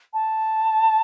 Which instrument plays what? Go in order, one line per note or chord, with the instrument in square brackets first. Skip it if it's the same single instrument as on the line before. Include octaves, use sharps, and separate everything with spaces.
[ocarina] A5